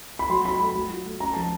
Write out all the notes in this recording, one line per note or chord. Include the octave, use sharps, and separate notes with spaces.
B5
F#3 C6
F#3 B5
A3 B5
F#3
F4
A3
C#4 A#5
F3 A5